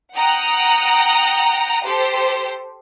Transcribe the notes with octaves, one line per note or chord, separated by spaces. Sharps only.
F#5 G5 A#5 D#6 F#6
G4 A4 C5